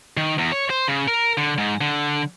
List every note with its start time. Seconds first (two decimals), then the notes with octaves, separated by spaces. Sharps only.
0.17 D#3
0.38 E2
0.52 C#5
0.70 C5
0.88 C#3
1.08 A#4
1.37 D3
1.58 G#2
1.81 D3